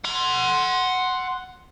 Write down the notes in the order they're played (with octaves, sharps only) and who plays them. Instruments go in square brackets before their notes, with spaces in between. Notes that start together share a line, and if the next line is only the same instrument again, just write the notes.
[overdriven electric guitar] F#5 C6